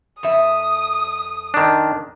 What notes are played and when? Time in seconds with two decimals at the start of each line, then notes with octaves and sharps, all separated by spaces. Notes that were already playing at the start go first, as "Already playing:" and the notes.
0.23 F2 E5 D#6
1.54 D#3 D4